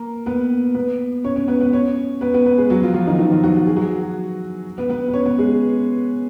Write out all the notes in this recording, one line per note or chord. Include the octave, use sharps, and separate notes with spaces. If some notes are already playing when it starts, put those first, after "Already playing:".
Already playing: A#3 A#4
B3 B4
B3 B4
C#4 C#5
C#4 C#5
B3 B4
B3 B4
C#4 C#5
B3 B4
B3 B4
B3 B4
G#3 G#4
F#3 F#4
F3 F4
F3 F4
D#3 D#4
D#3 D#4
F3 F4
F#3 F#4
F#4
G#4
F#3 F#4
B3 B4
B3 B4
B4
C#4 C#5
B3 B4
G#3 G#4